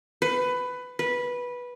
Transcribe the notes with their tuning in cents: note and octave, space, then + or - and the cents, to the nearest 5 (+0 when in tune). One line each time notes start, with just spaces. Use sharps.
B4 +15
B4 -10